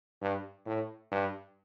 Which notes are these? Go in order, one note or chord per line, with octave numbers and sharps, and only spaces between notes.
G2
A2
G2